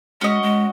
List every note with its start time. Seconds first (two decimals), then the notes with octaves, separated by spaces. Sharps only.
0.21 G#3 C#4 F#4 D#5
0.43 G#3